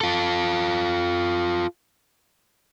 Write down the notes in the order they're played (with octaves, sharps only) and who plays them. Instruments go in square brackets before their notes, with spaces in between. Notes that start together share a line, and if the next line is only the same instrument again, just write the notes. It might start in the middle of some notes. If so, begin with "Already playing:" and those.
[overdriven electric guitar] F4 A4